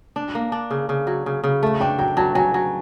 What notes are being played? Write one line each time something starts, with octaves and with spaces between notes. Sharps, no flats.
D4
A#3
D4
C#3
C#3
F#3
C#3
C#3
A3
D4 G5
F#3 G5
F#3 A5
F#3 G#5
F#3